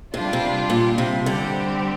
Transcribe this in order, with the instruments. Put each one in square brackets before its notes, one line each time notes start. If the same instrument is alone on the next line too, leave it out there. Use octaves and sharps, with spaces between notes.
[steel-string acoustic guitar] C3 [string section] G3 D4 F4
[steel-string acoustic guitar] C3
A#2
C3
[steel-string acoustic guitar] D3 [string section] G3 C4 G4